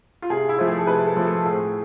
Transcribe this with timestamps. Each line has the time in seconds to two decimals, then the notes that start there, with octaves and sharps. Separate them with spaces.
0.22 F4
0.30 C3 G#4
0.49 E4
0.59 F3 A3 C4 F4
0.68 G#4
0.78 A4
0.87 C3 B4
1.06 A4
1.16 F3 A3 C4
1.27 A4
1.45 A2 G#4